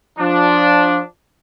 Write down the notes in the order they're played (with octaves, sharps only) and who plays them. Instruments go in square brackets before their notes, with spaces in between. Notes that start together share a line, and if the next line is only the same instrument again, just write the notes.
[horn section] F3 D4